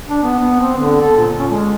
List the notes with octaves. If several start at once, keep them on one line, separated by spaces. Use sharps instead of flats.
D4
B3
B3
C4
D3
A4
A#2
C#4
G#3